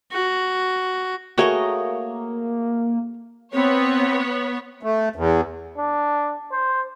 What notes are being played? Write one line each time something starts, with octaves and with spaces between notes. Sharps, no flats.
F#4
A3 A#3 F#4 G#4 A#4 C#5 D#5
B3 C4 C#5
A3
E2
D4
C5